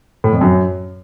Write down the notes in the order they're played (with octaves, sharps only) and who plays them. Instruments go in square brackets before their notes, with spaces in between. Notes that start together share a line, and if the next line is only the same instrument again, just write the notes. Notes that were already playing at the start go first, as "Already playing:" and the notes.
[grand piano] A2
F2
F#2